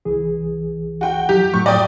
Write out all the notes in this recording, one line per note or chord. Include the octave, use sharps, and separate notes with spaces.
C2 E3 G#4
F#4 G5
F2 F#3 G4
A2 F#3 C#6
D5 G5 D#6